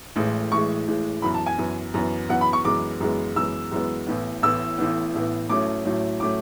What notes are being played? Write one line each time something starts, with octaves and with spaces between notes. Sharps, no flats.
A1 A2 E3 G#3
A1 A2 E3 G#3 C#6
A1 A2 E3 G#3
F#2 E3 B3 B5
A5
G#5
F#2 E3 B3
F#2 E3 B3
F#2 E3 B3 F#5
B5
C#6
F#2 E3 G#3 B3 D6
F#2 E3 G#3 B3
F#2 E3 G#3 B3 E6
F#2 E3 G#3 B3
A1 A2 E3 B3
A1 A2 E3 B3 E6
A1 A2 E3 B3
A1 A2 E3 B3
A1 A2 F#3 A3 C#4 D6
A1 A2 F#3 A3 C#4
A2 F#3 A3 C#4 D6